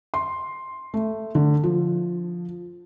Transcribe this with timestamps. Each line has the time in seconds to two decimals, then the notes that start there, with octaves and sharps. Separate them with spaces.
0.14 C6
0.94 A3
1.35 D3
1.64 F3